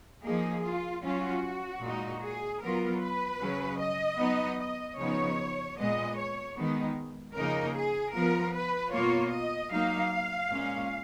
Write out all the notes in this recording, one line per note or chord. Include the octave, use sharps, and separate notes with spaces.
F3 A#3 D#4 G#4
F4
F#3 C#4 F4 F#4
A#2 G#3 D#4
G#4
F#3 B3 F4 A#4
B4
C#3 F#3 C#4
D#5
F#3 B3 D#4
D#5
C#3 F3 B3 D#4 C#5
A#2 G#3 B3 D#5
C#5
D#3 G#3 B3 D#4
C#3 F3 A#3 D#4 A#4
G#4
F3 B3 F4 A#4
B4
B2 A#3 F4 C#5
D#5
F#3 A#3 D#4 F5
A#2 G#3 C#4